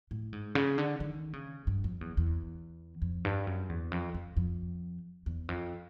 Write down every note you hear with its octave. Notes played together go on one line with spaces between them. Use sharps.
A2
G#2
C#3
D3
D#3
C#3
G2
F2
E2
E2
F2
G2
F#2
E2
F2
F2
F2
E2
F2